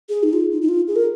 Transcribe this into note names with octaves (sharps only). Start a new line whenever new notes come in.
G#4
D#4
F4
D#4
D#4
F4
G#4
A#4